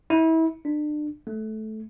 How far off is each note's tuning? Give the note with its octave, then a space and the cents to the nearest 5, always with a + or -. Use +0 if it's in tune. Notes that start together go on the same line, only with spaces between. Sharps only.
E4 -30
D4 +35
A3 -15